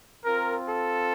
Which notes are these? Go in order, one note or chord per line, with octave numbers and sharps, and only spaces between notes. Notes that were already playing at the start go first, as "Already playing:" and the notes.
C4 F4 A#4
A4